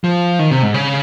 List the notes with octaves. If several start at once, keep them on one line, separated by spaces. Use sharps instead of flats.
F3
D#3
C3
G#2
C#3